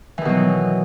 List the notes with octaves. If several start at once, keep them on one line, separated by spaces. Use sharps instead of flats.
B2 D#3 E3 F#3